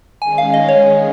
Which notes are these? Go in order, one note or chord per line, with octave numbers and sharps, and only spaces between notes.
D#3 G#3 C#4 G#4 G#5
F5
D#5
C#5